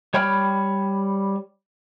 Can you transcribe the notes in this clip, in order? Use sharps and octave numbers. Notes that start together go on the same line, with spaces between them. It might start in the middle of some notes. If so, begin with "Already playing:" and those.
G3 C#5 G5 B5 F6